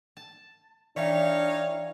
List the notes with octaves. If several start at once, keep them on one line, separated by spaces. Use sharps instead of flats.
A5
E3 D4 D#4 C#5 D5 E5 F5 G5